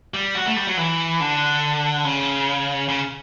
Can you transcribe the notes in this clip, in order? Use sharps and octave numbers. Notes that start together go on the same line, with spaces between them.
G3
F#4
A3
G3
F#3
E3
D3
C#3
C#3